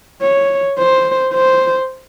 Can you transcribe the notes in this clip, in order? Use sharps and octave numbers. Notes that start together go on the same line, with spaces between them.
C#5
C5
C5